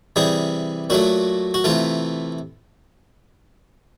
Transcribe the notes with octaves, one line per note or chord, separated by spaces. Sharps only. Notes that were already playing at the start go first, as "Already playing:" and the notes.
C3 E3 G3 G#4
A#2 F#3 A3 F#4
F#4
C3 E3 A3 F4